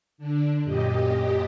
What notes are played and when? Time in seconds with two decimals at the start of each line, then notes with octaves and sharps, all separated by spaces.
0.18 D3 D4
0.63 F#2 A#2 G4 D#5